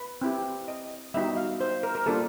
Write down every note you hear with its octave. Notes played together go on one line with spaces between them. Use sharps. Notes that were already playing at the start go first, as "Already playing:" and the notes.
Already playing: B4
C4 E4 G4
D#5
G3 B3 D#4 F#4 E5
F5
C5
A#4
A#4
G3 A#3 D4 F4 A4